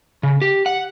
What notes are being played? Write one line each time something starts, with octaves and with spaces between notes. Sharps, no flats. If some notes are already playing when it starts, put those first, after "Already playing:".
C#3
G4
F#5